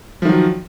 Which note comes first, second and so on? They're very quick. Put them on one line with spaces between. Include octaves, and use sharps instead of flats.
F3 D#3 F#3